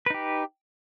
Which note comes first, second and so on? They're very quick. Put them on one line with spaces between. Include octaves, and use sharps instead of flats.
B4 D#4 G4